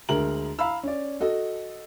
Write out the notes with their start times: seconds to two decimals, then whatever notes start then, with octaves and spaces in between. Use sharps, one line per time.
0.09 D2 G#3 A#4 F#7
0.59 F5 A#5 B5 E6
0.83 C#4 D5
1.20 F#4 A4 D#5